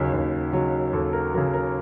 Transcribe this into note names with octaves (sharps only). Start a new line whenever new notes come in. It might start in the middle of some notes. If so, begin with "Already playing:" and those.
Already playing: D#2 C#3 F#3
D#2
C#3 F#3
D#2 A4
A#4
C#3 F#3 A#4
A#4